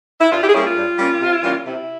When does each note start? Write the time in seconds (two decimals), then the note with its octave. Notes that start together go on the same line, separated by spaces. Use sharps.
0.21 E4
0.31 G2 F4
0.42 E4 G4
0.49 G#4
0.54 G3 A#3 C#4 E4 G4
0.66 F4
0.76 G2
0.99 G3 A#3 C#4
1.21 C3
1.43 E3 G3 A#3 C#4
1.65 C3 E4